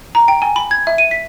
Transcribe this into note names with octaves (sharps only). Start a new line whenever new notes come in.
A#5
G5
G#5
B5
G#6
E5
D#7
B6